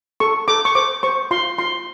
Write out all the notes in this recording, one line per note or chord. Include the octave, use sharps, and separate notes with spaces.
A4 C#6
A4 D6
C#6
C5 D6
C5 C#6
F4 C6
F4 C6